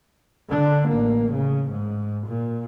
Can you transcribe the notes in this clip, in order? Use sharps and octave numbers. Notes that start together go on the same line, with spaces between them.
D3 D4
A1 A#3
C#3
G#2
A#2